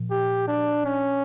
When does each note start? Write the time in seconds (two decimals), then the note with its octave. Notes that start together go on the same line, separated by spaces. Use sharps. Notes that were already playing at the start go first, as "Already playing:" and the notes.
Already playing: A#2 F3
0.11 G4
0.48 D4
0.85 C#4